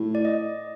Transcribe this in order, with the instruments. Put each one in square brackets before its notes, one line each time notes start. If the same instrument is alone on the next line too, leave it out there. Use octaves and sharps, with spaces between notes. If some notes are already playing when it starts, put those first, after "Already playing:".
Already playing: [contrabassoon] A2
[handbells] D5
D#5